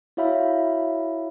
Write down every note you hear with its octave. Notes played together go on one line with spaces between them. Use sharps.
E4 F#4 C#5 E5 F5 B5